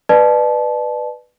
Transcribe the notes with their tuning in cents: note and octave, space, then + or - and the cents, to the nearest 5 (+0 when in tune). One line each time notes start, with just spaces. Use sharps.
B4 +0 D5 +30 A5 -25